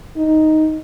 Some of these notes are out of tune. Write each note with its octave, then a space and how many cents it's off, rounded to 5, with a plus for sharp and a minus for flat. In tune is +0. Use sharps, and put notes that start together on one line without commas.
D#4 +5